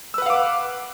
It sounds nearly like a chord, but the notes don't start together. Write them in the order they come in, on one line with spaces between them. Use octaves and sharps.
E6 B4 F#5 F5 D6